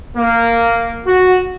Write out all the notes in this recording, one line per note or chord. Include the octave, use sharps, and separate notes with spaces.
A#3
F#4